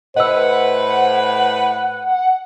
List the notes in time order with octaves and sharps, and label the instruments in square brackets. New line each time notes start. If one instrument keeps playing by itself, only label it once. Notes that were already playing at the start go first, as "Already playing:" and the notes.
[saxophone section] A2 B4 [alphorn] C5 [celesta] D#5 E6 [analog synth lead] F#5